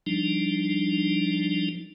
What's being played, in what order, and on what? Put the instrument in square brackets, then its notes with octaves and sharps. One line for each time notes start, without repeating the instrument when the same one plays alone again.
[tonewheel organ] F3 G3 D4 D#4